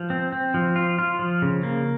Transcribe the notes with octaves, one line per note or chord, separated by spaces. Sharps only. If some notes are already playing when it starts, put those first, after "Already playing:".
Already playing: F3
C4
C4
F3
F4
F4
F3
C#3
A#3